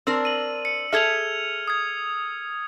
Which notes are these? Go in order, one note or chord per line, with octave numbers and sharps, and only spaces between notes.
C4 D4 A#4 E6
D#7 F#7
C#7
G#4 A4 E5 F6 G#6 F7
D#6 G#6